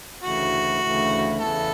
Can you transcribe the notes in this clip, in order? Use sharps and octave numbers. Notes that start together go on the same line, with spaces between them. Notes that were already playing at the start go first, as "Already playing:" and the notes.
D2 C#3 E3 A3 E4 F#4
D2 C#3 E3 A3 E4
E2 C#3 E3 B3 E4 A4